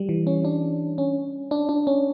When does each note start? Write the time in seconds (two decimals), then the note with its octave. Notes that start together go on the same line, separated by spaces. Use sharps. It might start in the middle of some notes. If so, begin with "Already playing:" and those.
Already playing: G3
0.09 E3
0.27 C#4
0.45 D4
0.98 C#4
1.51 D4
1.69 D4
1.87 C#4